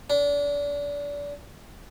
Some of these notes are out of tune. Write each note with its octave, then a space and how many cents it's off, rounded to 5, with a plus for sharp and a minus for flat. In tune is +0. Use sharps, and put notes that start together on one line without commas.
D4 -30